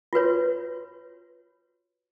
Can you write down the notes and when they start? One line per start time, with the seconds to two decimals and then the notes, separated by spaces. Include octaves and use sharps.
0.13 F4 F#4 B4 C#5